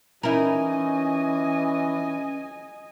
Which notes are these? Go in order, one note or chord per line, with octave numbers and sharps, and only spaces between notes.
E3 C#4 D#4 E4 A#4 D#5 G#5